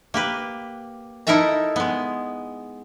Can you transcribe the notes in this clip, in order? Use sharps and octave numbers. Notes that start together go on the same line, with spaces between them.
A#3 G4 B4
D#4 E4 A4 A#4 E5 A#5
G#3 B3